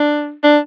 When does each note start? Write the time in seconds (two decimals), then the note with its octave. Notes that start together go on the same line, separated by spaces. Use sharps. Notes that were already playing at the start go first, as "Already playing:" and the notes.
Already playing: D4
0.43 D4